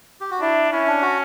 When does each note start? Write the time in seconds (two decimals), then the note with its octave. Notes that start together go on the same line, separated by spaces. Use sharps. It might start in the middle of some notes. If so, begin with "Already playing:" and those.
0.21 G4
0.31 F#4
0.40 D4 E4
0.72 C#4 E4
0.87 D4
1.02 F#4